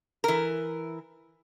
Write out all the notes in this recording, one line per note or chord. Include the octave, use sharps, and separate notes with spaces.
E3 A#4